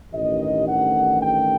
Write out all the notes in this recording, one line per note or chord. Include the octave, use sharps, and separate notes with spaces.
A1 G2 D#3 D#5
F#5
G5